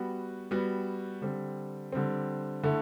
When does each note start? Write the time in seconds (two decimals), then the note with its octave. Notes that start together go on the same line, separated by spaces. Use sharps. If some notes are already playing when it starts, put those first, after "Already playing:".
Already playing: G3 B3 F#4
0.51 G3 B3 F#4
1.22 D3 G3 C4
1.92 D3 G3 C4
2.63 D3 A3 E4